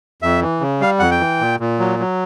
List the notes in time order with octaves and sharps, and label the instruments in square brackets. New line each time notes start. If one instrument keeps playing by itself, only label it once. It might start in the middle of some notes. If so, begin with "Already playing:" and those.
[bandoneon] F2 E5
E3
C#3
G3 F5
F2 F#5
G5
E3
A#2
A#2
F#3
F#3